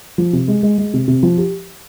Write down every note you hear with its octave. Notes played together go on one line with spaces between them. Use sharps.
F3
C3
G#3
G#3
G#3
C3
C3
F3
G4